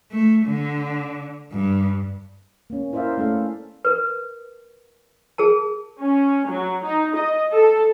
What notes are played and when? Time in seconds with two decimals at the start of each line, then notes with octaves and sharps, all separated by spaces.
0.12 A3
0.46 D3
1.52 G2
2.70 A#3 C#4
2.93 E4 A#4 C5 D5 E5 F5
3.18 A3 C#4 A4 F5
3.85 A#4 B4
5.38 G#4 A#4 A5
6.01 C#4
6.49 F#3
6.84 D#4
7.16 D#5
7.54 A4